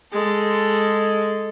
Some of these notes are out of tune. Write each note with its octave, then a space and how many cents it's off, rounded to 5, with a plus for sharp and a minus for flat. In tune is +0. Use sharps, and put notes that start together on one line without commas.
G#3 +0 A4 +0